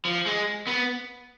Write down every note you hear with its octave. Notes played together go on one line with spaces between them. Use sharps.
F3
G#3
B3